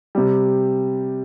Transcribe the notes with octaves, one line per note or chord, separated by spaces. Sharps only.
C3 G3